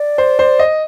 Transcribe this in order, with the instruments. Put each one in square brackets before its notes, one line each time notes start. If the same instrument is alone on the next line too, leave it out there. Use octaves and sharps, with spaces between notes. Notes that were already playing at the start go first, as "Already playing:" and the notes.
Already playing: [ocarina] D5
[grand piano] C5
C5
D#5